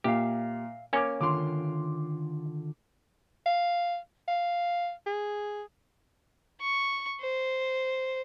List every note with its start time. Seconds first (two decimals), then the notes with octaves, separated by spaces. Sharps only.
0.04 A#2 G4 E5 F5
0.93 A#3 C#4 C#5 G#5 D6
1.21 D3 D#3 F4 C6 D6
3.46 F5
4.28 F5
5.06 G#4
6.61 C#6
7.21 C5